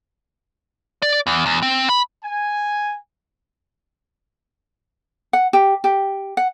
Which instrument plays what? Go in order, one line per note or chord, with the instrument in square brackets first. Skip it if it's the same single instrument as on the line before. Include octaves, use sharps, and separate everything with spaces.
[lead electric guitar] D5
E2
E2
C4
B5
[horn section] G#5
[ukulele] F#5
G4
G4
F#5